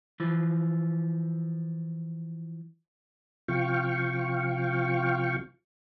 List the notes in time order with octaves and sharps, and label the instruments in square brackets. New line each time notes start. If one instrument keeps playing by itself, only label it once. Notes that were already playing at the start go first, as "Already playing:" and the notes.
[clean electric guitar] E3 F3
[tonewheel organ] C3 F3 F4 F5 G5 C#6